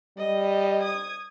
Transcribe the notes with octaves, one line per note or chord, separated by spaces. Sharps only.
G3 D#5
D#6 G#6